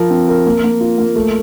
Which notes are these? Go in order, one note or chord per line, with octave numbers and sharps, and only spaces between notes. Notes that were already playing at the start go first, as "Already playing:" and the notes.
Already playing: F3 A#4
C4
A#4
A#3
A#3
F4
A#3
A3